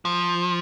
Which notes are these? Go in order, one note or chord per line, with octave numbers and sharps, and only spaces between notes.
F3